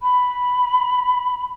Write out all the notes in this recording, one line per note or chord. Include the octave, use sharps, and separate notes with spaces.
B5